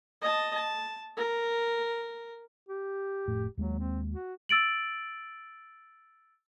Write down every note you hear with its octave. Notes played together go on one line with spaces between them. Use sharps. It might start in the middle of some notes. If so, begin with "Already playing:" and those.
D#5 A5
A5
A#4
G4
F1 A2
D#2 F#3 G#3 A#3
C4
F#4
E6 A6 D7 F#7